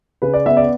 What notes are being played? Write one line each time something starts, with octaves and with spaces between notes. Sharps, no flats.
C#3 B4
D5
B3 E5
D5